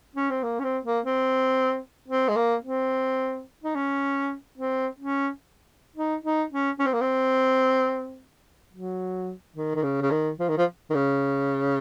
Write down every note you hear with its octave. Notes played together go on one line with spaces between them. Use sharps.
C#4
C4
A#3
C#4
C4
A#3
C4
C4
G#3
A#3
C4
D#4
C#4
C4
C#4
D#4
D#4
C#4
C#4
C4
A#3
C4
F#3
D#3
D#3
C#3
C#3
D#3
F3
D#3
F3
D#3
C#3